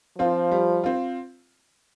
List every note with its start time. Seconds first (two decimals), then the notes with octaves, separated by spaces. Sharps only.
0.19 F3 C4 F4
0.51 G3
0.84 C4 F4